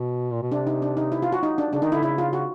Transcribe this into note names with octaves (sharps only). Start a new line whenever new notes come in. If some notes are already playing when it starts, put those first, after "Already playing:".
Already playing: B2
A#2
B2
C3 D4
D#4
D4
D#4
E4
F4
F#4
D#4
D4
C#3 D4
D#3 D#4
D3 E4
C#3 E4
F4
F#4